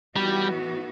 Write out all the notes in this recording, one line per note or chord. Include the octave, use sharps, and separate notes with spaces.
A2 E3 G3 B3 D#4 F#4